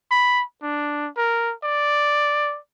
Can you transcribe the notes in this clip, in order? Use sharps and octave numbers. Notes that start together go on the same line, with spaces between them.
B5
D4
A#4
D5